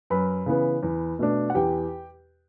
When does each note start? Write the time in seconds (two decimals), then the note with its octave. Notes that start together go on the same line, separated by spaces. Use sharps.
0.10 F#2 B4 B5
0.46 C#3 E3 B3
0.83 E2
1.19 B2 A3 D4
1.50 F#5
1.55 E2 G4 G5